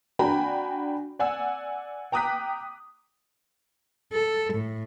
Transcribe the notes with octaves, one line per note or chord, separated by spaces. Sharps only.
D4 F#4 G5 G#5 A#5 B5
D5 F#5 G#5 E6
G5 A#5 D6 D#6 F#6 B6
A4
A2